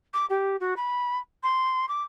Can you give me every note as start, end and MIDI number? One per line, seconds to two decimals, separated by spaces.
0.13 0.26 86
0.29 0.56 67
0.60 0.74 66
0.76 1.18 83
1.43 1.88 84
1.88 2.02 86